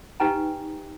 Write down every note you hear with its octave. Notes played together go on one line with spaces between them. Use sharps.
D#4 G4 B4 G5 G#5 A#5